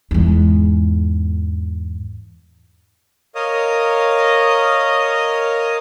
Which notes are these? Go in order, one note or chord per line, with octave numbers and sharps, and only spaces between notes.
E2 G#2
A#4 C#5 D#5 F5 D#6